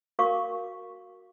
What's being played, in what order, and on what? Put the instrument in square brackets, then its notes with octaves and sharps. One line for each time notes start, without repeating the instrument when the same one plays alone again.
[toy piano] F#4 A#4 F5 C#6 D6